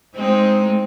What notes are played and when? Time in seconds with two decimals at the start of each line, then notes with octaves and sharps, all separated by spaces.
0.15 G#3 C4 D#4